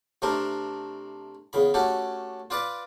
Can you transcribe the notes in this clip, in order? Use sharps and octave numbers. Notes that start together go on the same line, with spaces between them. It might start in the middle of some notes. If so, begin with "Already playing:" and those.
C3 A3 C4 D4 A#4
E2 C#3 B5
A3 C#4 F#4 G4 A4
F4 B4 D5 B5 D6